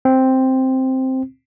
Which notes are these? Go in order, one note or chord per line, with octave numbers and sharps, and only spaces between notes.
C4